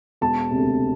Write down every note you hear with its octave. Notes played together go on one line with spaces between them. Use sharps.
E1 A5
D2 C3